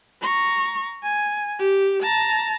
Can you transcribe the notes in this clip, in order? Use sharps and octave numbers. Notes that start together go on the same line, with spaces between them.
A#5 C#6
G#5
G4
A5 A#5